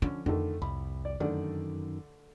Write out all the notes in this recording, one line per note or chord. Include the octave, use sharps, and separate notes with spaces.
D3 F3 C#4
F2 D3 D#3 A3
C2 B5
D5
F#2 D3 D#3 A3 D5